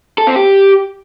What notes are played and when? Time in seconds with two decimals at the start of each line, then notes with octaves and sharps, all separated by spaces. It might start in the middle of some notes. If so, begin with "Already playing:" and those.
0.18 A4
0.27 C4
0.36 G4